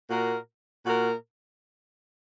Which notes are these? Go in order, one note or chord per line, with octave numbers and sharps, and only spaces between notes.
A#2 A#3 F#4 A#4
A#2 A#3 F#4 A#4